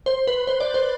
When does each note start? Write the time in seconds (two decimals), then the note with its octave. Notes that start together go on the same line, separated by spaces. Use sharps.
0.06 C5
0.27 B4
0.47 C5
0.60 D5
0.74 C5